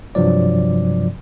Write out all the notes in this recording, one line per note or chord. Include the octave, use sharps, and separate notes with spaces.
G2 C3 F3 F#3 D5